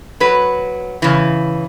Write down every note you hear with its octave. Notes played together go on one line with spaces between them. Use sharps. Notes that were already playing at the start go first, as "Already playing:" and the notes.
F#3 B4
C#3 E3